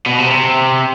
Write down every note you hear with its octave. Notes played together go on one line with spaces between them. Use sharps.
B2
C3
C3